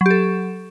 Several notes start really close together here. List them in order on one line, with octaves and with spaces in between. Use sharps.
F#3 G4 A4